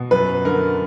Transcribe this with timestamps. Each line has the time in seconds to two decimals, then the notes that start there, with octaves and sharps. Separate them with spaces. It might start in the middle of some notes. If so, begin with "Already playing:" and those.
Already playing: B2
0.11 F#2 B4
0.45 D3 A#4